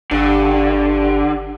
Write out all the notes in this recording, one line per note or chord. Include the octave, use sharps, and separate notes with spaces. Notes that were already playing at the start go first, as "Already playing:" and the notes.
G1 G2 D3 D5